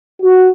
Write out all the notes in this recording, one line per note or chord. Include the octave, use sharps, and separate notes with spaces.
F#4